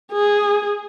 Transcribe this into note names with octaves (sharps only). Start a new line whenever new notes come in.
G#4